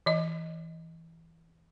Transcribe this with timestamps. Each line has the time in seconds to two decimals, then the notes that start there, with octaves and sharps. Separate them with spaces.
0.06 E3 D#5